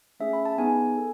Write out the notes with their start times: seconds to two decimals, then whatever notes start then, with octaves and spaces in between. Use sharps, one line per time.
0.20 A3 C#4 G#4 E5
0.33 B5
0.45 A5
0.58 B3 D#4 G#4 G#5
0.98 A4